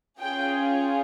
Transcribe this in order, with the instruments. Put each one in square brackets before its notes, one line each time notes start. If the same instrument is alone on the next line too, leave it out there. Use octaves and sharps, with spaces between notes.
[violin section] C#4 F4 G#4 G5